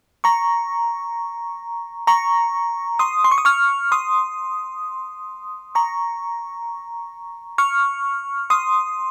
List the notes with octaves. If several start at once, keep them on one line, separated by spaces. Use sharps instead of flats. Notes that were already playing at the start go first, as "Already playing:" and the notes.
A#5 C#6
A#5 C#6
C6 D#6
C6
C#6
D#6
C#6 F6
C6 D#6
A#5 C#6
C#6 F6
C6 D#6